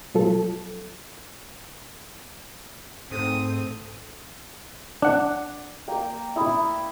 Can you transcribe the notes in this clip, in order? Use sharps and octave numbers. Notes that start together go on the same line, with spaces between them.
B2 F3 F#3 F4 A4
G#2 A3 C4 D#6
D4 F#5
A#3 G5
E4 D#6